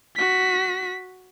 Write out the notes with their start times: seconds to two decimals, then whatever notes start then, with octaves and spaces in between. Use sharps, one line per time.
0.16 F#4 B6